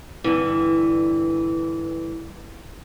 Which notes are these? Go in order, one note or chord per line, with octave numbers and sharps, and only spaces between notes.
G2 D3 E3